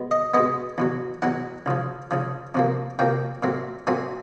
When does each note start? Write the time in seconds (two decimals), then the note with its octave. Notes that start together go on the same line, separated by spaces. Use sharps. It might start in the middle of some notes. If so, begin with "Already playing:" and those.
Already playing: B2 G#3 B3
0.11 D#5
0.34 B2 G#3 B3 D#5
0.78 E2 B2 F#3
1.22 E2 B2 F#3 F#5
1.66 C#2 C#3 F3
2.11 C#2 C#3 F3
2.54 F2 C3 F3 A#3
2.99 F2 C3 F3 A#3 G5
3.43 A#2 F#3 A3 C4
3.87 A#2 F#3 A3 C4 G#5